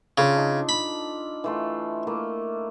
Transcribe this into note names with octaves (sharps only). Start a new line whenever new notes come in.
C#3 D4 F4 A4
D4 D#4 F4
B5
E3 A3 F4
A3 A#3 E4